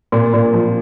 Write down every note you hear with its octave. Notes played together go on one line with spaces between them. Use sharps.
A#2
A#2
F3